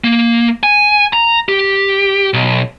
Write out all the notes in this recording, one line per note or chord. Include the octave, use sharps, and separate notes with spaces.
A#3
G#5
A#5
G4
B1